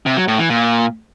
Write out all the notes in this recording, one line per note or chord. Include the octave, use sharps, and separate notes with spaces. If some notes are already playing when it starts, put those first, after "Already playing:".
C3
F#3
A2
E3
A#2